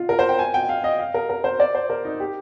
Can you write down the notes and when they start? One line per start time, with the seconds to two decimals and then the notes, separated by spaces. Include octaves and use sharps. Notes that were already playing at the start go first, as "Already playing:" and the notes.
Already playing: F4
0.09 A#4
0.19 C5
0.29 G5
0.39 G#5
0.54 G5
0.69 F5
0.84 D#5
0.99 F5
1.14 A#4
1.30 A#4
1.44 C5
1.60 D5
1.75 C5
1.90 A#4
2.05 D#4
2.20 G4